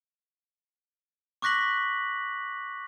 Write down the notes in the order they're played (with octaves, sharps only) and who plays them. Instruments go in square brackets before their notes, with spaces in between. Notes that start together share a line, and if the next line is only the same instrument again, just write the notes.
[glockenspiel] C#6 D6 F#6 A#6 B6 F#7